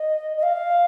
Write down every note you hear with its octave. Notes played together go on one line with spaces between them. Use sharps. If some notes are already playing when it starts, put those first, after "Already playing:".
Already playing: D#5
D#5
F5